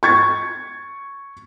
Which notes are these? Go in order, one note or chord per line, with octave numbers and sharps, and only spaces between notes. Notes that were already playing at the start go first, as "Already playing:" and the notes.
C#6 G#6 A6